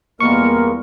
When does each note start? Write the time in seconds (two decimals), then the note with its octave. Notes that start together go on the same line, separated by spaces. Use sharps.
0.20 E2 A#2 G3 G#3 A#3 B3 A#4 C#6